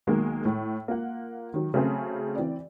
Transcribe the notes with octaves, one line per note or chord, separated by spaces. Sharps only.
B1 D#3 G#3 A#3
A2
A#3 F4 F#5
D#3 F#3
C#3 F#3 A3 C4 G#4 C5
E3 C4 D5